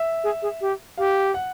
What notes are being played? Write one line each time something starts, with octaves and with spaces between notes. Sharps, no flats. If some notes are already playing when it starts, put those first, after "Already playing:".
Already playing: E5
G#4
G#4
G4
G4 F5
F#5